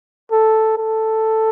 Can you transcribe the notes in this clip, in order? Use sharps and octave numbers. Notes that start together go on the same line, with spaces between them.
A4
A4